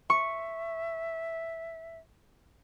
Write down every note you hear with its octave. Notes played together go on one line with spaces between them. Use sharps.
E5 C#6